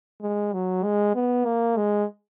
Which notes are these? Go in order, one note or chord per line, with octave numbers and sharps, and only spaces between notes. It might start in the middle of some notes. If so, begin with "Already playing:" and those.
G#3
F#3
G#3
B3
A#3
G#3